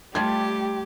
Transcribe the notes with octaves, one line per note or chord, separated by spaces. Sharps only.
G3 A3 F4 G4 A5 C6 G#6